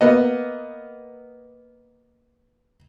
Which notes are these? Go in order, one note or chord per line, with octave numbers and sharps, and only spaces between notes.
A#3 B3 D#5